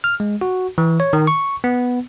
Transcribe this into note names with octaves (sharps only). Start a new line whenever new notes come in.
F6
G#3
F#4
E3
C#5
D#3
C#6
B3